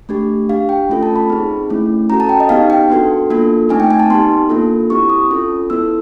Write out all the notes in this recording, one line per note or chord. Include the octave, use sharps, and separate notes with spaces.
A3 D4 G4
D4 G4 F5
G5
A3 C#4 F4 A4
A5
B5
C4 D#4 G#4
A3 C#4 E4
C#4 F#4 A4 A#5
A5
G5
D#5
B3 D#4 G4 F5
G5
B3 D4 F#4 A4
A#3 D4 F4 A4
A3 C4 D#4 G#5
G5
G#5
A5
B3 D#4 G4 C6
A#3 D4 F4 A4
C4 E4 G4 C#6
D#6
C#4 F4 A4
B3 E4 A4 E6